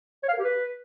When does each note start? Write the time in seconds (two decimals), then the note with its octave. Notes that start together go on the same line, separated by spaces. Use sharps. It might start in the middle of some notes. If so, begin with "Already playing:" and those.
0.23 C#5
0.28 F5
0.33 A#4
0.38 G4
0.44 B4